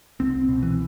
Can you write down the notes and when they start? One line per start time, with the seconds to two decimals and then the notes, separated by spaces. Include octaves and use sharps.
0.20 C2 C4
0.49 B2
0.63 E3